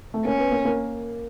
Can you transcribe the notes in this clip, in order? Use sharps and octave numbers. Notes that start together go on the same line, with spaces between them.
A3
A#3 C#4
B3
A#3
A#3